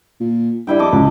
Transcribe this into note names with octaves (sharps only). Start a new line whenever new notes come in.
A#2
G2 G3 E4 G5
F2 A4 D#5 D6
C#2 F3